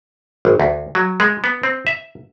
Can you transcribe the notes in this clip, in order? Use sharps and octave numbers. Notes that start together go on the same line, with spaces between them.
G#1
D2
F#3
G#3
B3
C4
E5